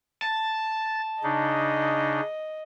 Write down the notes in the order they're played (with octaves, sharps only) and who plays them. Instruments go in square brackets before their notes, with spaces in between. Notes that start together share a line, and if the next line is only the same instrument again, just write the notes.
[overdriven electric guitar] A5 [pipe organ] A6
[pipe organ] C#3 D4 D#4 [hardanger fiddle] D#5